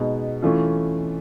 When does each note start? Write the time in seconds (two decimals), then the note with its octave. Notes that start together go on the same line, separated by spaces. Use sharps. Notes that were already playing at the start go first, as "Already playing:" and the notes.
Already playing: B2 G#3 B3 D#4
0.42 E3 A3 C#4 F4